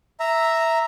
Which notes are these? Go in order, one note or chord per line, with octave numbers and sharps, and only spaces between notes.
E5 A#5